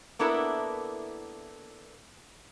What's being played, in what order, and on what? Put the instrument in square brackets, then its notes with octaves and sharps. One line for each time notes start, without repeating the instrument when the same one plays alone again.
[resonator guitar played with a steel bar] A#3 B3 D4 E4 A4 A#4